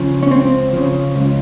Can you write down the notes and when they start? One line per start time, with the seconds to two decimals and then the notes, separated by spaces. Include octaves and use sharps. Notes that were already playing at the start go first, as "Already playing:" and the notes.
Already playing: C#3 F3
0.23 C#4
0.31 C#2 C4
0.73 C#3 F3
1.16 C#2